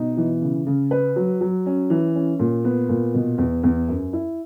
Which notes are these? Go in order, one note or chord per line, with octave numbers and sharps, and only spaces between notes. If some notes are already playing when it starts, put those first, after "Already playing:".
Already playing: B2 D#4
E3
C#3
C#3
B4
F#3
F#3
C#4
E3
C#4
A#2
B3
A#2
B2
E2
E2
F#2
E4